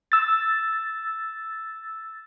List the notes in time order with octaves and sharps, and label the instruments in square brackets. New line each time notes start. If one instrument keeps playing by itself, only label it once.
[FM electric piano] E6 A6